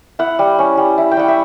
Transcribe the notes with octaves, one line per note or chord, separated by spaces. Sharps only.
E4 F#5
G3
C#4
G3
E4
G5
G3 F#5
E5